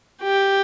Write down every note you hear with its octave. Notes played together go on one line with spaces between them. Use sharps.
G4